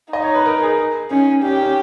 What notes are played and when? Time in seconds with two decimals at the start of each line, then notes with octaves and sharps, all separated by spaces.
0.13 D#4 D#5
0.24 C#5
0.35 B4
0.46 A#4
0.62 G#4
1.11 C#4 D#4
1.43 C#4 G4
1.53 D#4
1.62 C#4